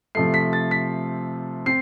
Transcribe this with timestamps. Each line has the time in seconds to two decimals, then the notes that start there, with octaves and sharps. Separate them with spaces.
0.15 C3 F3 A3 C7
0.34 B6
0.53 A6
0.71 B6
1.66 C4 C7